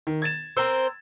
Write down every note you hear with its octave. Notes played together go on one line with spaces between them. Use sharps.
D#3
G#6 A6 E7
C4 A#4 C5 E6